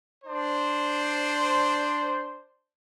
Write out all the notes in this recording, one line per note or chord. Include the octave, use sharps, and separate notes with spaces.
D4 C5